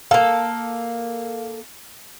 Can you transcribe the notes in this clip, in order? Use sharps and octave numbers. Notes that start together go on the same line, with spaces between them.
A#3 A4 F5